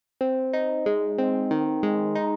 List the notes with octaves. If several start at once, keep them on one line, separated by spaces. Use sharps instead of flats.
C4
D#4
G#3
C4
D#3
G#3
D#4